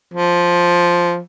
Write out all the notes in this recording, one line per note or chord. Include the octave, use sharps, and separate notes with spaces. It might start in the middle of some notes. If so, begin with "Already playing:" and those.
F3